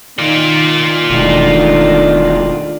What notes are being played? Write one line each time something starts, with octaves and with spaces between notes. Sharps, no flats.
D#3 F4 D5
E1 D#3 A3 D4